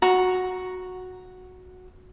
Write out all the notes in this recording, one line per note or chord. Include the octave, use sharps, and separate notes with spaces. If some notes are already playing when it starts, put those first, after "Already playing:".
F#4 A#5